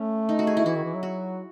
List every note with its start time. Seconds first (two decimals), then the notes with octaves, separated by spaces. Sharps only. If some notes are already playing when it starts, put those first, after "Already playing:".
Already playing: A3 C#4
0.29 D#4
0.39 F#4
0.47 G#4
0.57 E4
0.65 E3 F#4
0.76 D#3
0.84 E3
0.94 F#3
1.03 F#4